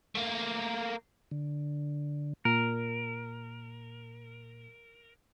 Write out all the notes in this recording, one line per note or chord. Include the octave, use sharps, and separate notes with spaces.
A3 A#3
D3
A#2 A#4